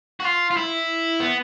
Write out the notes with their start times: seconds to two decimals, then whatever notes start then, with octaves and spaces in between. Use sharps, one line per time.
0.20 F#4
0.24 F4
0.51 F4
0.57 E4
1.20 B3